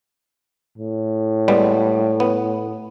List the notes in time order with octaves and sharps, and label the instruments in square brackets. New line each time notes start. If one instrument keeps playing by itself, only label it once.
[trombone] A2
[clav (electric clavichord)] G3 G#3 B3
B3